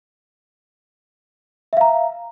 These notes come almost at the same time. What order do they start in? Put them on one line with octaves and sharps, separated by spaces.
E5 F5 A#5